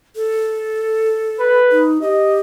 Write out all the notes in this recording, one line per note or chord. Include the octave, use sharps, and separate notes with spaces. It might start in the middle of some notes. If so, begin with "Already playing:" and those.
A4
B4
D#4
G4 D#5